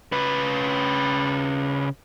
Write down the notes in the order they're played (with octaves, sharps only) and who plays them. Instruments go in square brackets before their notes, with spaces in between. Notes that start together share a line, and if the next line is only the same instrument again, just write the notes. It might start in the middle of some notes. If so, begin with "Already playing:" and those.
[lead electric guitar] C#3 B4